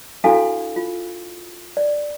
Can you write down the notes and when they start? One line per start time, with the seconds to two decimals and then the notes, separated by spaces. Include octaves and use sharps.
0.24 D4 E4 F#4 A4 F5 G#5
0.76 F4
1.77 D5